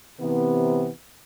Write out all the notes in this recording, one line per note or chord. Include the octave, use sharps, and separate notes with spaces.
C3 E3 B3